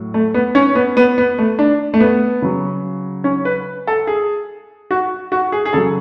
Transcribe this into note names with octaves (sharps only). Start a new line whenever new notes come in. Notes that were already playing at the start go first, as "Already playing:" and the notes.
Already playing: A2 F#3
A3
B3
C#4
B3
B3
B3
A3
D4
A3
B3
C#3 F#3
C#4
B4
A4
G#4
F#4
F#4
G#4
G#4
C#3 F#3 A4